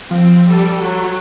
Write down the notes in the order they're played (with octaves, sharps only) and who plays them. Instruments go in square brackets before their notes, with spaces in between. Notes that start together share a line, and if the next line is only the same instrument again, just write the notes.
[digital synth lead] F3 [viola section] C4
[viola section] G3 A4
F#3